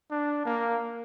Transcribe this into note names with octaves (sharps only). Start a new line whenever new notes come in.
D4
A#3